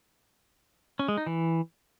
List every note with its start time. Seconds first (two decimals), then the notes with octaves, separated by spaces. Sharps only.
0.99 C#4
1.08 G#3
1.17 D#4
1.26 E3